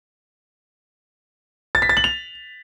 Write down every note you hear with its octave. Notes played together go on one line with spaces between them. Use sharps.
A6
B6
A6
F#7
F7